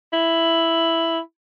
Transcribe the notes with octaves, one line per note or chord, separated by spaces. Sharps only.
E4